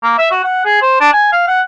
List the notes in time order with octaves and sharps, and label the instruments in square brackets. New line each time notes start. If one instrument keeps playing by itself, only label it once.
[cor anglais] A#3
E5
F#4
F#5
G#4
C5
D4
G#5
F5
F#5